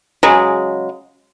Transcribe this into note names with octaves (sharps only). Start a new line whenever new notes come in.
C#3 F#3 G#3